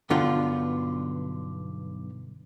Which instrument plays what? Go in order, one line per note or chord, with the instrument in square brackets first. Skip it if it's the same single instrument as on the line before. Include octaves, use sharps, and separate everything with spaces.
[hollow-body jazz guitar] B1 G2 D3 B3 F4 G5